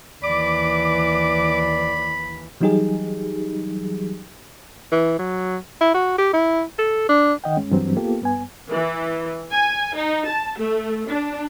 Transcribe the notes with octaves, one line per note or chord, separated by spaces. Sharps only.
D#2 E3 D5 B5 D6
E3 F#3 G3 D#4 G4 G#4
E3
F#3
E4
F#4
G4
E4
A4
D4
D#3 D#5 F#5 G5
G2 G#3 C#4
G2 E3 F#3 C4
A#3 B3 F4 G4 A4
G2 B3 G#5
E3
G#5
D#4
A5
A3
D4